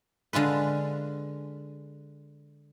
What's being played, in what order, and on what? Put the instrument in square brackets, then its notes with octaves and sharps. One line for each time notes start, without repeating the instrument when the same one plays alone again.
[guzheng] D3 G#3 F4 B4